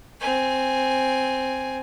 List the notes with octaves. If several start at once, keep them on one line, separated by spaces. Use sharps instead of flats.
C4 G#5